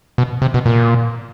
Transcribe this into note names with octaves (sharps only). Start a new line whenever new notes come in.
B2
C3
B2
A#2